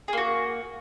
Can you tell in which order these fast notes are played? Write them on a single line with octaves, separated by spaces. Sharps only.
G#4 A#3 F#4